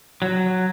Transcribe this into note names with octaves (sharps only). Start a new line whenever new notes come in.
F#3